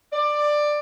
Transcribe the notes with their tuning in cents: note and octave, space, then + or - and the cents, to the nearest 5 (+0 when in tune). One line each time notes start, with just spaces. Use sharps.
D5 +15